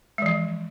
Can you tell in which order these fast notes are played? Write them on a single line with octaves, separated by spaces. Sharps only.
G#3 E3 F3